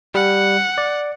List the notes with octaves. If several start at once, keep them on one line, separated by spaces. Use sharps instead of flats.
G3 F#5
D5